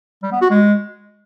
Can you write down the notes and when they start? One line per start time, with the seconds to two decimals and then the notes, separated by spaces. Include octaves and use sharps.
0.23 G3
0.32 B3
0.41 F#4
0.50 G#3